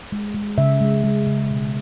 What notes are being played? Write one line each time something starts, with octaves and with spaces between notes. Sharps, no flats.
G#3
G#3
C#3 E5
G#3
G#3
C#3
B2